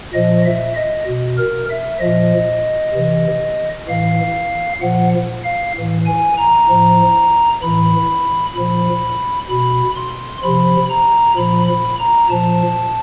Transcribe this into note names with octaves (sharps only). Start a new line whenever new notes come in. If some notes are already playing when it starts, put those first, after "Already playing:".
A#2 F3 D#5
E5
D#5
B2
A#4
E5
A#2 F3 D#5
C3 E3
A2 E3 F5
A#2 F3 F#5
F5
A2 E3
G#5
A#5
A2 F3
A2 E3 B5
A#2 F3 B5
B2 B5
C6
C3 F3 B5
A#5
A#2 F3 B5
B5
A#5
A#2 F3 A5